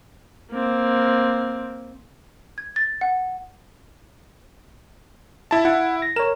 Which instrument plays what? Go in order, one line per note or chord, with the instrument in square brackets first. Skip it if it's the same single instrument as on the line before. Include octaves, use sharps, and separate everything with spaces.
[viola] A#3 C4
[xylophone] G#6
A6
F#5
[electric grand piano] E4 A5
[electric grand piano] E4 [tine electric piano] F#5
[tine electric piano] A#6
[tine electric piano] A#4 C#5 [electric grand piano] E7